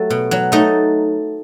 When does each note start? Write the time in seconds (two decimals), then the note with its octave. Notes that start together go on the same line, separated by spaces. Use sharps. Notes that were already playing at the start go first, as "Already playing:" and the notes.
Already playing: F#3 A3 G4
0.10 B2
0.31 F#3
0.52 A3 D#4 D#5